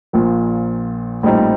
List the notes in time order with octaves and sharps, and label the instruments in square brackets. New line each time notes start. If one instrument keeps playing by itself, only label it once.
[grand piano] A#1 A#2 F3
A#1 A2 G3 C4 D#4